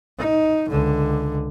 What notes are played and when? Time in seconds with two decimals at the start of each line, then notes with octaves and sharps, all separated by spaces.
0.18 D#4
0.70 C#2 D3